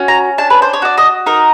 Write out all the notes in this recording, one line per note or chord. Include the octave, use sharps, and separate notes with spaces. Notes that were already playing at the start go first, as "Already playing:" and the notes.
Already playing: C#4 F#4
A#5
D4 A5
B4
C5
C#5
F#4 D5
D#5
D#4 A#4